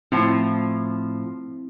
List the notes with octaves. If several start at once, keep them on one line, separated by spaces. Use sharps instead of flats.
A2 F3 C4 E4